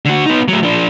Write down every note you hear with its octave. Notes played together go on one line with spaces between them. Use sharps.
D3 F#4
B3 D#4
F#3 A3
F3 D4